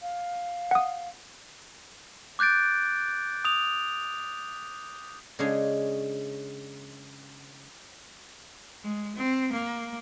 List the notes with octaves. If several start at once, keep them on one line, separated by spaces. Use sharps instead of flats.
F5
F#5 D#6
D6 F#6 G6 A6 D7
D#6 F7
C#3 G#3 D4 G#4 C#5
G#3
C4
A#3